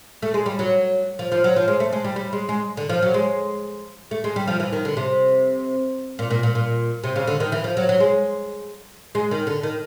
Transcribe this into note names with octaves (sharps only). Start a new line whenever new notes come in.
A3
G#3
G3
F#3
F3
F3
F#3
F3
G#3
A3
G#3
G3
G3
G#3
G#3
D3
F3
F#3
G#3
A3
G#3
G3
F3
E3
D#3
D3
C3
A#2
A#2
A#2
A#2
C3
C#3
D3
D#3
E3
F3
F#3
F#3
G#3
G#3
D#3
D3
D#3